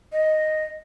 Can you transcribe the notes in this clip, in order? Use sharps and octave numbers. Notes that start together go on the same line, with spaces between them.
D#5